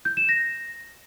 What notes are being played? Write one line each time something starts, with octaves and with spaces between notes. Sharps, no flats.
G6
E7
A#6